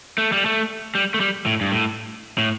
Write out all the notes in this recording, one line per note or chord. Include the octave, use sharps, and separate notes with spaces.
A3
G3
A3
G3
A3
G3
A2
G2
A2
A2